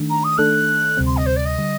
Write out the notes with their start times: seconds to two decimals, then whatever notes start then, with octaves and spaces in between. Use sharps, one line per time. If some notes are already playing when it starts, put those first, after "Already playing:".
Already playing: D#3 A3 D4
0.09 A#5
0.24 D#6
0.38 D#3 A3 D4 A4 F#6
0.97 D2 C3 G3 C4
1.06 C6
1.17 D#5
1.26 C5
1.36 D5
1.45 D#5
1.58 D3 G3